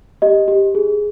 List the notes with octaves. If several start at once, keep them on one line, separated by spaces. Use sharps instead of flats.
G4 D#5
G4
G#4